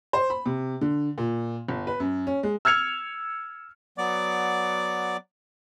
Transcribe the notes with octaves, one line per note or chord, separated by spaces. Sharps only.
C5
B5
C3
D3
A#2
G1
B4
F#2
C#4
G#3
E6 F6 G#6 C#7 F7
F#3 B3 D5 D6